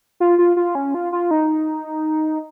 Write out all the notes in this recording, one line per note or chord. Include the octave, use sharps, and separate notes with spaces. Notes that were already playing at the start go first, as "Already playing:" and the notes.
F4
F4
F4
C#4
F4
F4
D#4